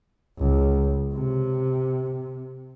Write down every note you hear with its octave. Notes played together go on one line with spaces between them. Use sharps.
C#2
C3